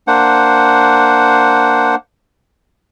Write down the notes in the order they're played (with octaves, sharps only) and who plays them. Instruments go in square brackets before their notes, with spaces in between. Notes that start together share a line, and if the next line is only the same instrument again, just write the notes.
[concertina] A#3 D4 C5 F#5